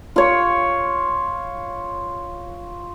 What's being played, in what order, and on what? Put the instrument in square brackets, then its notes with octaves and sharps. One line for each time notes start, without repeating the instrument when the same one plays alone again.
[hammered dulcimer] F4 C#5